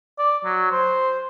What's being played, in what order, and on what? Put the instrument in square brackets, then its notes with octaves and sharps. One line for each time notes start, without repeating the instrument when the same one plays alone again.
[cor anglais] D5
F#3
C5